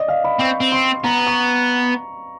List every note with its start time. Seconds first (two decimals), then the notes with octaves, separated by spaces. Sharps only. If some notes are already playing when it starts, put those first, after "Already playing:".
Already playing: D5 D#5
0.08 F5
0.24 B5
0.40 C4 C#6
0.61 C4
0.72 C6
1.04 B3 A#5
1.27 C#6